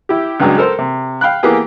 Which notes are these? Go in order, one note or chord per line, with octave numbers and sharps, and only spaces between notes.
E4 G4
C#2 G2 F#3 G#3 D4
A4 A#4 C5
C3
F5 G5 B5 F#6
E3 A#3 B3 G4 G#4